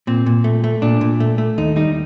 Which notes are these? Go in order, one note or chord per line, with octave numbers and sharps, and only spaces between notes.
A#2 C4
A#2
A3
A3
A#2 D4
A#2
A3
A3
D#2 D#4
G3 D#4